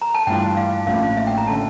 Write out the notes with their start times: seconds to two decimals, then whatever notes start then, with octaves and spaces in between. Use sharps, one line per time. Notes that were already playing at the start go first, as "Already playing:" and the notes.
0.02 A#5
0.14 A5
0.27 G2 E3 A3 D4 F4 G5
0.57 F5
0.87 A1 A2 F3 A#3 D4 F5
1.17 E5
1.27 G5
1.38 A#5
1.47 D3 A3 C#4 A5